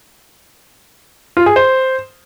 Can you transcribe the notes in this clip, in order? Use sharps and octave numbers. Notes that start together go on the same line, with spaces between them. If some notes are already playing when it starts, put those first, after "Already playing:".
F4
G#4
C5